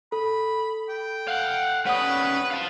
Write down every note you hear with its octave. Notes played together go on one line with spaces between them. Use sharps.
A4 B5
G5
F5 F#5
G3 C#4 B4 F#5 D#6
F5 A5